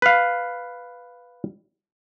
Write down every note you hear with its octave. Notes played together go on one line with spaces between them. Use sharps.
B4 F5